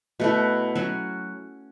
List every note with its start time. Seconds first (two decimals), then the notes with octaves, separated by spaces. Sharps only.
0.20 B2 A3 E4
0.75 F#3 C#4 F#4